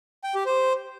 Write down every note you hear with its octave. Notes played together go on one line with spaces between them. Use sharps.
G5
G4
C5